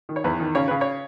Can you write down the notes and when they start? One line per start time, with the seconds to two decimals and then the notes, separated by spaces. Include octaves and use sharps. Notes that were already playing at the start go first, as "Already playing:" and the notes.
0.09 D#3
0.16 C#5
0.24 E2 B4
0.40 D#3
0.55 C#3 C#5
0.68 C#3 B4
0.81 C#5